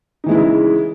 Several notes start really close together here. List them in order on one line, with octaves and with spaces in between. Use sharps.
D#4 E3 G#3 E4 C#3